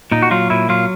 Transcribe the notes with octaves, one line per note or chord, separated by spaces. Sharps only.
A#2 D#4
F#4
F#3 F4
A#2 E4
F#3 F4